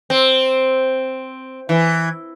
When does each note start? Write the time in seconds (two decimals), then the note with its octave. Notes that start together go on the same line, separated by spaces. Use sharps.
0.10 C4
1.69 E3